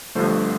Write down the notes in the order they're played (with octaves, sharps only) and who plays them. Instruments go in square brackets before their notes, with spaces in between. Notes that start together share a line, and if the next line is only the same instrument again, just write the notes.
[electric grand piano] G1 G2 D3 F3 A3 C5